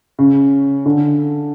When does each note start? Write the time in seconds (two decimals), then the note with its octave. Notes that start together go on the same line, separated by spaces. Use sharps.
0.19 C#3
0.86 D3